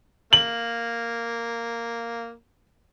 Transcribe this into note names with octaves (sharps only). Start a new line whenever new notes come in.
A#3 F#7